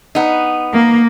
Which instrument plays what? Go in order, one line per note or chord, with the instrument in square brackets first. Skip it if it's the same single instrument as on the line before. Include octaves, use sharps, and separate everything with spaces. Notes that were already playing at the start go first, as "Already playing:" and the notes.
[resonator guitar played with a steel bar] B3 D#4
[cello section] A#3